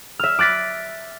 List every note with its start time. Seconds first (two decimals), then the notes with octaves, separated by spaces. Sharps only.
0.19 E5 F6
0.39 D6 F#6 A6 B6